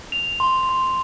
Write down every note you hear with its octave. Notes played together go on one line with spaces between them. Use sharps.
F7
C6
C6